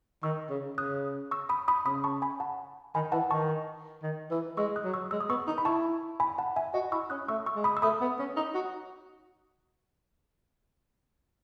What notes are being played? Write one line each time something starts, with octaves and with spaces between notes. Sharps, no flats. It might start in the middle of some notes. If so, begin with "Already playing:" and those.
D#3 C#6 E6
C#3
C#3 D#6 F#6
C#6 E6
B5 D#6
B5 D#6
C#3 B5 D#6
A5 C#6
G#5 B5
F#5 A5
D#3 G#5 B5
E3 F#5 A5
D#3 A5 C#6
D#3
E3
G#3 C#6 E6
D#6 F#6
F#3
C#6 E6
G#3 E6
D#6
B3 C#6 E6
D#4
B5
E4 A5 C#6
G#5 B5
F#5 A5
E5 G#5
F#4 D#5 F#5
E4 C#6 E6
C#4 D#6 F#6
A3 C#6 E6
C#6 E6
G#3
B5 D#6
E6
A3 B5 D#6
B3
C#4
D#4
F#4